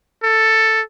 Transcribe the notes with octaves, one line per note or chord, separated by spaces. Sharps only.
A4